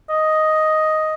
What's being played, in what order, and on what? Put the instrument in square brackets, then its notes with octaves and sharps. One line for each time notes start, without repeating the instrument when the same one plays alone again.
[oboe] D#5